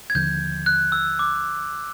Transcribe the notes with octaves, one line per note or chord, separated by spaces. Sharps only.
G#6
D#2 D3 F3 G6
F#6
E6
D6